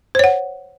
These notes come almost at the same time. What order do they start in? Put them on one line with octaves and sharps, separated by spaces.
C5 C#5 F#5